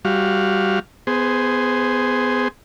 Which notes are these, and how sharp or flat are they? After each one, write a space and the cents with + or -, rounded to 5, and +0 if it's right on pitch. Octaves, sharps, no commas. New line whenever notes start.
G3 +0 F#4 -15 F5 +0
B3 +25 G#4 +0 C5 +0